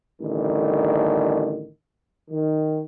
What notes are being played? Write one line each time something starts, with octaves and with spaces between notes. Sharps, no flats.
A1 D3 D#3 G3
D#3